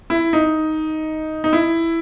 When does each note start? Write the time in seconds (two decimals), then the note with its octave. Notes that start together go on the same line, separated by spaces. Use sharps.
0.10 E4
0.33 D#4
1.44 D#4
1.53 E4